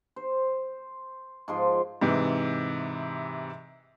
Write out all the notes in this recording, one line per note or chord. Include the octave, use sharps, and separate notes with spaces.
C5
G#2 F3 C6
G#2 C3 E3